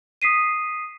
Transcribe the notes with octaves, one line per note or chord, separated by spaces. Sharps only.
D#6 B6 C7 D#7